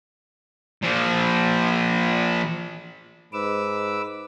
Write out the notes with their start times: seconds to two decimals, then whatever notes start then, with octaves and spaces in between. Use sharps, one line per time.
0.83 A#2 F3
3.33 G#2 B4 D6 E6